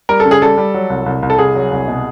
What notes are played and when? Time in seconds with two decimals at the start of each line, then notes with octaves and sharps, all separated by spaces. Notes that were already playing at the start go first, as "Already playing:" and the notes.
0.09 G3 A#4
0.20 A4
0.25 C#3
0.31 G#4
0.42 G3 A4
0.58 G3
0.74 F#3
0.90 C2
1.06 C2
1.22 C2
1.30 A4
1.38 C2 G#4
1.55 F#3
1.71 C2
1.88 B2